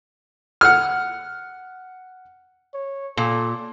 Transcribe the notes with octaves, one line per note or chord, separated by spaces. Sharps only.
F#5 F6
C#5
A#2 A4